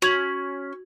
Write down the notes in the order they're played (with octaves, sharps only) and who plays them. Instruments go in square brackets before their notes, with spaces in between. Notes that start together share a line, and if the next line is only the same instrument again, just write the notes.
[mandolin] C#4 [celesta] F#4 G#6 F#7